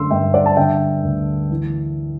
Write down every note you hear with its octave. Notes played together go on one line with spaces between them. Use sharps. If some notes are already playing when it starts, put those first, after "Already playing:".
Already playing: F#2 D3 C6 E6
G2 E5 G5
D5 F#5
A5
D3 E5 G5
D2
E3